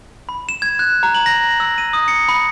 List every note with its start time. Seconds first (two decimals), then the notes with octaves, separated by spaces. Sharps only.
0.29 B5
0.49 E7
0.62 G#6
0.79 F#6
1.03 A#5
1.15 F#7
1.26 A#6
1.60 E6
1.78 D#7
1.93 D#6
2.08 C#7
2.29 B5